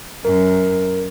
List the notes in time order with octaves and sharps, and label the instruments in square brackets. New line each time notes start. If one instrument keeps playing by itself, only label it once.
[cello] F#2 [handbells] A#4